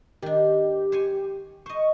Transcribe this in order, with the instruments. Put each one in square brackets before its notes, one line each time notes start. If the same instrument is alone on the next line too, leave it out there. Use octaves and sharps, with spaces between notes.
[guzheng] D#3 D4 [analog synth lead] G4
[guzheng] C5 C#5 G#5
[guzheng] C5 D#5 [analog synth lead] C#6